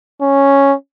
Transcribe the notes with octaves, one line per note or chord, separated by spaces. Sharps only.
C#4